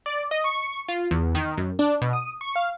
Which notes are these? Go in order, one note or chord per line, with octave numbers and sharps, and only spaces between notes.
D5
D#5
C#6
F4
E2
D#3
F#2
D4
B2
D#6
C#6
F5